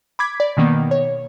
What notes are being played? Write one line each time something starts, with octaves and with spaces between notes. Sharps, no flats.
B5 D6 G#6 B6
D5
B2 D#3 A#3 B3
C#5